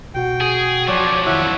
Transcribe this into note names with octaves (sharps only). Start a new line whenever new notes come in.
B2 F#4 F#5 G5
G#4
F3 F#3 C#5 D5
F2 D#3 E4 C#5 E5 F#5